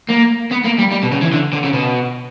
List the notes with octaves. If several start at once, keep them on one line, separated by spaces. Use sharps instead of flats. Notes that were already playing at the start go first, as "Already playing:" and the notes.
A#3
B3
A#3
G3
G3
B2
C#3
E3
D3
D3
C#3
B2